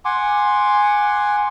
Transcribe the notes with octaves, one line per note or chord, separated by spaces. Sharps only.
F#5 G#5 C6 D6